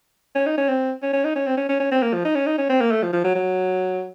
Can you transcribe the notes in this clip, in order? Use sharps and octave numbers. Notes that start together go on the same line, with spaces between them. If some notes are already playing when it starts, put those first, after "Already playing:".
C#4
D#4
C#4
C4
C#4
C#4
D#4
C#4
C4
C#4
C#4
C#4
C4
A#3
F3
D#4
C#4
D#4
C#4
C4
A#3
A3
F3
F3
F#3
F#3